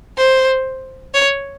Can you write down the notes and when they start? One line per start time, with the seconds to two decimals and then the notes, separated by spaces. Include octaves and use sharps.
0.17 C5
1.14 C#5